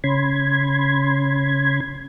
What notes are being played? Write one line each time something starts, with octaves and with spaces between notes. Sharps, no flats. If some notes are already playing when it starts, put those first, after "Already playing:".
C#3 C#4 B5 C6 G#6